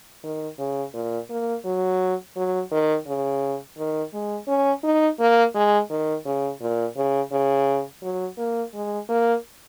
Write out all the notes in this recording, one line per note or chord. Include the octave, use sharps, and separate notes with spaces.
D#3
C#3
A#2
A#3
F#3
F#3
D#3
C#3
D#3
G#3
C#4
D#4
A#3
G#3
D#3
C#3
A#2
C#3
C#3
F#3
A#3
G#3
A#3